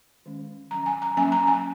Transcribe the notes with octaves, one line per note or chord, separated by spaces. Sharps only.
D#3 G#3 C#4
F#3 C#4 A#5
G#5
A#5
F#3 A#3 C#4 G#5
A#5
G#5